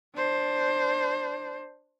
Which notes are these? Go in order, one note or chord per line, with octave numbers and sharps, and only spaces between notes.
D4 C5